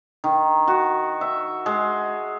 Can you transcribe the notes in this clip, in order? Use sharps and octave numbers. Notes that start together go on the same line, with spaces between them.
D#3
F#4
E5
G#3